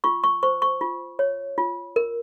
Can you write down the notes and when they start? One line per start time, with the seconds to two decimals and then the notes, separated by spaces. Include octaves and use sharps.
0.04 F4 C#6
0.24 C#6
0.43 C5 C#6
0.62 C#6
0.81 F4
1.19 C#5
1.58 F4
1.96 A#4